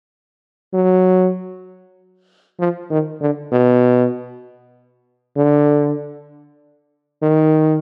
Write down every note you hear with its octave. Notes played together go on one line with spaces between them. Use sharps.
F#3
F3
D#3
D3
B2
D3
D#3